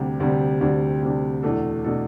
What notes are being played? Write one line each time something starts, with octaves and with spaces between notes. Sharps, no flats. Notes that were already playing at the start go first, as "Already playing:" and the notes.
Already playing: D2 C3 G3 D4
D2 C3 G3 D4
D2 C3 G3 D4
D2 C3 G3 D4
E2 B2 A3 D4 A4
B2 A3 D4 A4